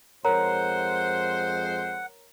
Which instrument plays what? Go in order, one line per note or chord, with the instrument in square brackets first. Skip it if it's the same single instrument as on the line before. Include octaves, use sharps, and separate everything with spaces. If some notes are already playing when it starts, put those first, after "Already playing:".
[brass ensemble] F2 G#3 C5 [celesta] A#4 C#5 A#5 [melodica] F#5